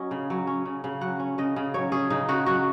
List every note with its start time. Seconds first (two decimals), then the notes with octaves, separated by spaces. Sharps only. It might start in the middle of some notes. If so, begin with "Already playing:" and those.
Already playing: F#3 C#4 D#5
0.11 C#3
0.30 F#3
0.47 C#4
0.65 C#3
0.84 C#3
1.01 F#3 F#5
1.20 C#4
1.38 C#3 D#5
1.56 C#3
1.74 F#3 C#5
1.92 C#4 G#4
2.10 C#3 D#4
2.28 C#3 F#4
2.46 F#3 F#4